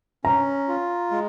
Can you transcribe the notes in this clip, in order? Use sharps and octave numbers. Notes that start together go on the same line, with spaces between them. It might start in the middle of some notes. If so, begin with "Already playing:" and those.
C#4 A#5
F4
G#3